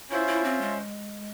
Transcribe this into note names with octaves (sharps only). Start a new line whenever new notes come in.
C#4 E4 F4 C5 E5
E4
C4
G#3